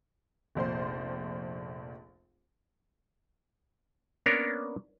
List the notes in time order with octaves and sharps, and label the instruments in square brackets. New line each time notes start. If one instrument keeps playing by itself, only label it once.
[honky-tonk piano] F1 A#1 C5 C6
[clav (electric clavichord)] A#3 B3 C#4 D4 A#4 C#5